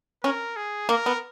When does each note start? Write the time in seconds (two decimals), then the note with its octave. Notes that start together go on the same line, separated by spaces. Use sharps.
0.24 C#4 A#4
0.56 G#4
0.89 A#3 A#4
1.06 B3